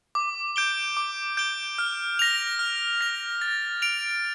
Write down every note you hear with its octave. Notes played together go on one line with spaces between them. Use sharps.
D6
G6 D7 G7
D6
G6 D7 G7
F6
A#6 F7
F6
A#6 F7
A6
D7 F7